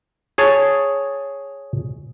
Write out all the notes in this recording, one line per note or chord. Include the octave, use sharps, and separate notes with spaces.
G#4 C#5 A5